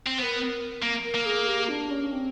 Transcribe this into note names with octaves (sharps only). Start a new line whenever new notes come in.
C4
B3 A#4 C5
A#3
A#4
A#3
G#4
G4
D4
C#4
C4